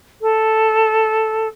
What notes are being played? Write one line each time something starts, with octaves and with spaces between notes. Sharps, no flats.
A4